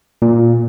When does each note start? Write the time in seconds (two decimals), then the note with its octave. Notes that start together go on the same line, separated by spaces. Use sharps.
0.22 A#2